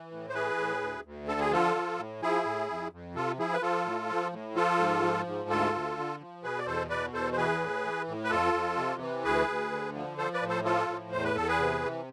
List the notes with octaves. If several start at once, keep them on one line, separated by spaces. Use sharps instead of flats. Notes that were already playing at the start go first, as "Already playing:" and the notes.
Already playing: E3
A2
C5
E3 G#4 B4
A2
D2
D2
D3 A4
G#4
F3 F4 A4
F3
A2
F3 E4 G#4
A2
F2
F2
C3 F4 A4
F3 E4 G#4
B4
F3 F4 A4
A2
F3
A2
F3 F4 A4
G#2
F3
G#2
D2 F4 A4
D2
D3
F3
B2 G#4 B4
D5
E2 A4 C5
B2 B4 D5
E2 A4 C5
C5
E3 G#4 B4
A2
E3
A2
B4
F2 F4 A4
F2
C3
E3
D2 G#4 B4
D2
D3
F3
F3 A4 C5
B4 D5
A2
A4 C5
F3 F4 A4
A2
E2 C5
B4
E2 A4
G#4 B4
C3
E3